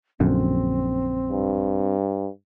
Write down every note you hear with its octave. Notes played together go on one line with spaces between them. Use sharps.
A#1 F#2 D3 C4
G2